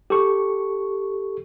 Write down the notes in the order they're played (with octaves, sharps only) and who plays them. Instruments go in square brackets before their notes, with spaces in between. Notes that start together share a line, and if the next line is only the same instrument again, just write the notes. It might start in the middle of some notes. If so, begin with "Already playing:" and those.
[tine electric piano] G4 A4 C#6